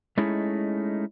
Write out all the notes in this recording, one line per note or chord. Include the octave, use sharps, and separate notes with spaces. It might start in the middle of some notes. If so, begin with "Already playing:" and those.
G#3 A3 C#4 D#4 E4 G#4